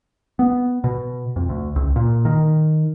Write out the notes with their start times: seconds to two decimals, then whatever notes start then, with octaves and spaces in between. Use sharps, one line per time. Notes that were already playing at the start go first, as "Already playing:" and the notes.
0.39 B3
0.84 B2
1.36 F2
1.49 D2
1.76 C#2
1.96 A#2
2.25 D#3